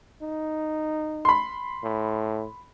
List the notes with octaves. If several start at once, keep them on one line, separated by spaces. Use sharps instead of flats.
D#4
B5 C6
A2